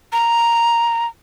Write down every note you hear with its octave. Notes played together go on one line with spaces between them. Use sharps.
A#5